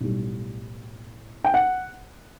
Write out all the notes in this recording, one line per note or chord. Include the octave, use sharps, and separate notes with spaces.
B1 A2 G3
G5
F#5